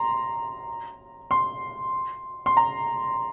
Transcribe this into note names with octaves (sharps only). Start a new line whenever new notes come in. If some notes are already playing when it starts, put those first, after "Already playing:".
Already playing: A#5 C6
C6
C6
A#5